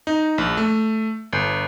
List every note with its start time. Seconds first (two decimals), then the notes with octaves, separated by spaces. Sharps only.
0.07 D#4
0.38 A#1
0.57 A3
1.33 G1